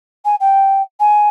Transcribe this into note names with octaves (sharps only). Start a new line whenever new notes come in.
G#5
G5
G#5